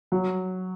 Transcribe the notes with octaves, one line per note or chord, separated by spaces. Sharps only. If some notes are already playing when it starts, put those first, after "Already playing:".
F#3